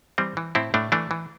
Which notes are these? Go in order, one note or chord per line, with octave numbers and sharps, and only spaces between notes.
E3 G3 C4
E3
A2 C4 E4
A2 A3 D4
E3 A3 D4
E3